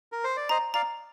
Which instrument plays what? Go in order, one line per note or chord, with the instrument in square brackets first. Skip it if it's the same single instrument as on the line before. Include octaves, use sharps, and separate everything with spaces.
[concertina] A#4
C5
D5
[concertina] C5 D#5 [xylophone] A#5
[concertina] D5 F5 [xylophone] A#5